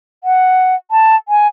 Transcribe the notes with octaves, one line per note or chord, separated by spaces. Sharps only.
F#5
A5
G#5